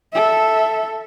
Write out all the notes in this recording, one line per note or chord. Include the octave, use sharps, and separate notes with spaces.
A4 E5